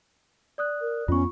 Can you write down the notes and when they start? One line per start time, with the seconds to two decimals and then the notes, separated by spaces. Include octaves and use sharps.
0.58 D5 D#6 F#6
0.81 A#4
1.08 F2 B3 C#4 F4 C#6